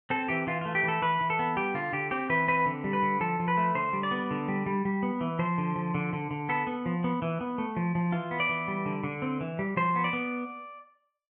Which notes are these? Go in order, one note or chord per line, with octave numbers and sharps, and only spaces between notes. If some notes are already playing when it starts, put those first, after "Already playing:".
C4 A4
E3 G4
E3 F4
A3 F4
G4
E3 A4
E3 B4
E3
A4
B3
G3 G4
D3 F4
D3 G4
C4 G4
E3 B4
C4 B4
D3
G3
B4
D3
F3 A4
F3
B4
A3
D3 C5
G3
D5
B3
D3
G3
G3
G3
B3
E3
F3 C5
D3
F3
D3
D3
D3
B3 A4
B3
F3
B3
E3
B3
A3
F3
F3
E3 F4
B3
D5
E3
G3
D3
D3
C4
E3
G3
F3 C5
B3
D5
B3